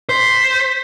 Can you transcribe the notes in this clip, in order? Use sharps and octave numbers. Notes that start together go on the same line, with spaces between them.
C5 B6